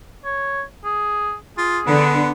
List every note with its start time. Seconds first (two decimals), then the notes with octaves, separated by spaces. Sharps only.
0.25 C#5
0.85 G#4
1.58 F4 G#4
1.87 D3 B3